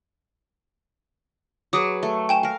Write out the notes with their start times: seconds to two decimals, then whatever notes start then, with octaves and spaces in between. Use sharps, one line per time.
1.73 F#3 G#4 B4 D6 D#6
2.03 A3
2.29 G5 G#5 E7
2.43 A#4 F5